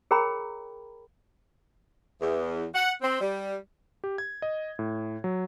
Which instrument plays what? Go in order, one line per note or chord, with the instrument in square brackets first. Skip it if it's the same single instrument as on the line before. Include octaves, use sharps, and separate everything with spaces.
[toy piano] G#4 A#4 C#5 G5 A#5 B5
[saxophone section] E2
F#5
C4
G3
[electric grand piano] G4
G#6
D#5
A2
F#3